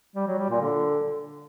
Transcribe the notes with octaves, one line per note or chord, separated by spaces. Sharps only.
G3
F#3
G3
A#2
D3